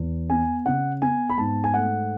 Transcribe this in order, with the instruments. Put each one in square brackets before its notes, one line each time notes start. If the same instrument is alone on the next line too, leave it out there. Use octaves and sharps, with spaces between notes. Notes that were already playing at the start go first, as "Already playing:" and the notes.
Already playing: [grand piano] E2
B3 G#5
C#3 F#5
B3 G#5
B5
G#2 A5
G#5
A3 F#5